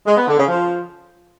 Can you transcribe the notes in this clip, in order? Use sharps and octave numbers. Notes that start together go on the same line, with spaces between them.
G#3
B3
D3
C#3
F3